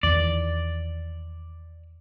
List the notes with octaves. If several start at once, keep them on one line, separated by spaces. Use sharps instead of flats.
E2 D#3 D5